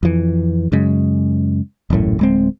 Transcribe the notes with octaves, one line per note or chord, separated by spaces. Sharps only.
F2 E3
F#2 C#3 G#3
D#1 A1 F#2 A2
D1 G#3 C4